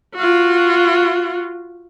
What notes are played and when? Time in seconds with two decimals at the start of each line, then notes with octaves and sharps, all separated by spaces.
0.15 F4 F#4